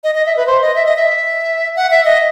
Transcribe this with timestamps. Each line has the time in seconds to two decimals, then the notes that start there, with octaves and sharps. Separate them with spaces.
0.04 D#5
0.15 D#5
0.26 E5
0.37 B4
0.47 C5
0.61 D#5
0.75 E5
0.86 D#5
0.96 E5
1.76 F#5
1.91 E5
2.05 D#5